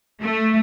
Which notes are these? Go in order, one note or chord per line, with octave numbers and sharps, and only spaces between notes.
A3